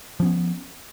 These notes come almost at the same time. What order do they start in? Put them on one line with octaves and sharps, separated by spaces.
F3 C#4 B3